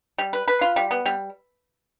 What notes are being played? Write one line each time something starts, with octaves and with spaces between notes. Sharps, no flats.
G3
B4
B4
F4
G3
B3
G3